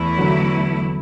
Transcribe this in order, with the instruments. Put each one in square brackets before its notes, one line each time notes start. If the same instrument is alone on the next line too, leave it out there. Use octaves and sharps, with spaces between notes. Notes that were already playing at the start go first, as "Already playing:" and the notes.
Already playing: [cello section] E2 E3 A3 E4
[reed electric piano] D3 F#3